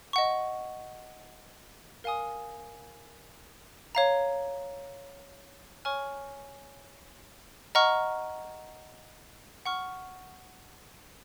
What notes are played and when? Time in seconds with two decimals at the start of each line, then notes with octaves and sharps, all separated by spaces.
0.13 D#5 F#5 C#6
2.04 A#4 F5 G#5 D#6
3.95 C#5 F5 A#5
5.85 C#5 G#5 C#6 F6
7.75 D#5 F#5 A#5 C#6 F6
9.66 F#5 C#6 F6